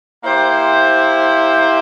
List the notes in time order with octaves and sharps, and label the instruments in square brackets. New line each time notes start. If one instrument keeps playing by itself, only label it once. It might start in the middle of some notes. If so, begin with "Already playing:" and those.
[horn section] A#3 E4 G4 C5